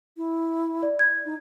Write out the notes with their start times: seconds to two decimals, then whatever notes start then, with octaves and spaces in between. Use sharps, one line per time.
0.17 E4
0.83 D5
0.99 G#6
1.25 D#4